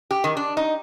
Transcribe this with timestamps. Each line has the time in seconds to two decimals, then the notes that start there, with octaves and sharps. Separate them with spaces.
0.11 G4
0.24 D#3
0.37 D4
0.57 D#4